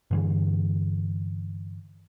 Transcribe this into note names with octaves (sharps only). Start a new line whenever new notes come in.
G2 D3 E3